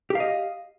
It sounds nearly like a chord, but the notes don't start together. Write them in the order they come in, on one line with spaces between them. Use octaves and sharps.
G4 F5 D#5